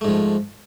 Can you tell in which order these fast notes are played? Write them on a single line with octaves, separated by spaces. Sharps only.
A3 G#2 F3